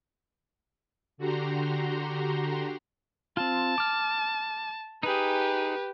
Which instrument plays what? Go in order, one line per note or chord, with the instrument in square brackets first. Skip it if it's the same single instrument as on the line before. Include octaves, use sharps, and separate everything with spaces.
[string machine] D3 F#4 G4 A#5 C6
[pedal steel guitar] C4 F4 [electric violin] A5
[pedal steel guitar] D6 F6
[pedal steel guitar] D#4 G#4 [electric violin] G4 B4